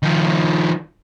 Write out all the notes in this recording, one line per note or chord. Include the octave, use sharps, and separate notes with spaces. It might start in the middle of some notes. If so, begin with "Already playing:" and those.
D#3 F3